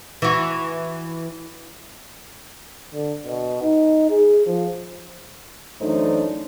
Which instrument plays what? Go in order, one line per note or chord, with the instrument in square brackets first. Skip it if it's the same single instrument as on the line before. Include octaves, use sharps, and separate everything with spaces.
[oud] E3 F#4
[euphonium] D3
B2
D#4
G#4
F3
[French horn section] F#2 E3 A3 D4 D#4 C5